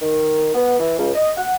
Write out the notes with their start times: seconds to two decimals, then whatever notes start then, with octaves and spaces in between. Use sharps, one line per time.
0.02 D#3
0.55 B3
0.79 E3
0.99 C#2
1.15 D#5
1.38 F#5